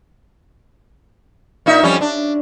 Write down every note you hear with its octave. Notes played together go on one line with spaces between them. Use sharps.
A#2 D#4 E5
F2 G3 C#4
D4